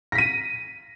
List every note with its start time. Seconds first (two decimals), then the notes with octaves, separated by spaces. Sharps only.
0.12 A#6
0.15 B6
0.18 D#7